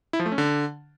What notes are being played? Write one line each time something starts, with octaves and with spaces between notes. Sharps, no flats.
E4
F3
A3
C#4
D3